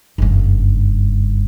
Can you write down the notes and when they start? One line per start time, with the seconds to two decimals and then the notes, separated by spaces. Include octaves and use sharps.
0.18 F#1 G2